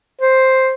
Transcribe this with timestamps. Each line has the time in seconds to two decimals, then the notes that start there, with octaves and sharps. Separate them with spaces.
0.21 C5